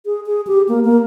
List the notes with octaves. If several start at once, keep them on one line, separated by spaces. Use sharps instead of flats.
G#4
G#4
G4
A#3
A#3